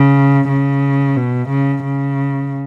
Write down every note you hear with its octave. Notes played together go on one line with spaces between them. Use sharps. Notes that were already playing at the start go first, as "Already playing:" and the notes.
Already playing: C#3
C#3
B2
C#3
C#3